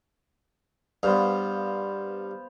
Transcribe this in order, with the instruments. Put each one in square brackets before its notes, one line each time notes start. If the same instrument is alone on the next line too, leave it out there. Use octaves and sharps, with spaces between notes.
[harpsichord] G2 [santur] B3 C5 F5